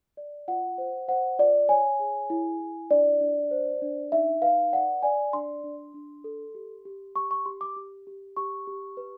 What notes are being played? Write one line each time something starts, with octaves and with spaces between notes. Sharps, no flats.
D5
F4 F#5
C5
C5 F#5
F4 D5
C#5 G#5
G#4
E4
E4
D4 D5
D4
C5
D4
D#4 E5
B4 F5
D5 F#5
D5 G#5
D4 C6
D4
D4
A4
G4
G4
G4 C#6
C#6
G4 C6
D6
G4
G4
G4 C#6
G4
B4